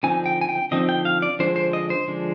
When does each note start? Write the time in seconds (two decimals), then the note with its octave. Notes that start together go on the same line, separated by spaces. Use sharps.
0.03 D3 F3 C4 D#4 G#5
0.26 G5
0.41 G#5
0.49 G5
0.71 D3 F3 C4 D#4 D#5
0.89 G5
1.05 F5
1.22 D5
1.39 D3 F3 G#3 D4 C5
1.56 C5
1.73 D#5
1.90 C5
2.08 D3 F3 G#3 D4